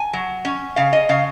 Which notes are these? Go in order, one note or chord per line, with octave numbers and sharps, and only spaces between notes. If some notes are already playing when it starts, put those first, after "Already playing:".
Already playing: G#5
F#3
C#4
C#3 F5
D#5
C#3 F5